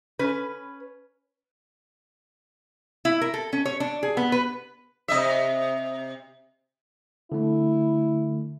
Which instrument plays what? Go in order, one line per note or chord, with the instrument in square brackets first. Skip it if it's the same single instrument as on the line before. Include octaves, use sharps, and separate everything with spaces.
[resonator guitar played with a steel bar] C#4 B4
E4
A#4
A4
C#4
C#5
D4
G#4
B3
B4
[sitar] C3 D#5 E5
[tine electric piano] D3 A3 [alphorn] E4